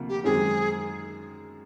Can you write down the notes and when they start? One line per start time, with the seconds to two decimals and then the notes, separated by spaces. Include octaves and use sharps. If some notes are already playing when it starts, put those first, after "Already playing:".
Already playing: D2 C3 F3 A#3
0.09 G4
0.24 F#2 D#3 G#3 C4 G#4